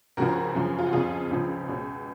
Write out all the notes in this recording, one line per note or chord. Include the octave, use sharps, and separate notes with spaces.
C#2 C#3 F3 F#4 A#4
F#2 C#3 F3
F4
F#4
F2 C#3 F3 F4 G#4
C#2 C#3 F3
C#2 B2